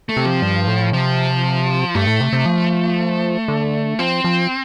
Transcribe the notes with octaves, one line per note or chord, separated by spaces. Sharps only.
A3
C3
F3
G2
A2
C3 F3
G2 A3
A2
C3
C3
F3
D3
F3 C4
F3